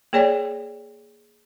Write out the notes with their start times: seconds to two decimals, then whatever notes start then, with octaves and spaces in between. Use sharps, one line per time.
0.13 A#3 G#4 C#5 D5 G#5